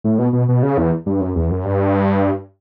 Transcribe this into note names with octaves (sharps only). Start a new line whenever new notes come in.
A2
B2
B2
B2
C#3
E2
G2
F#2
E2
F#2
G2